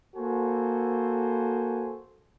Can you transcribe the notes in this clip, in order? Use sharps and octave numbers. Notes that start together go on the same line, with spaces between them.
A#3 F#4 A4 C5 G#5